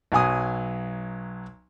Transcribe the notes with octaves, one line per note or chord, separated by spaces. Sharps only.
B1 F#3 G#5 D#6